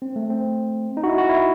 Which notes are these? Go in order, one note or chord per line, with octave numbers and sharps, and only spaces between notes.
C4
A3
C4
D#4
F#4
E4
F#4
E4